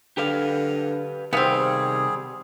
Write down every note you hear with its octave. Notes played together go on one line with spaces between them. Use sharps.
D3 G4 B4 F5
C3 D#3 G3 B3 C4 G#4 F5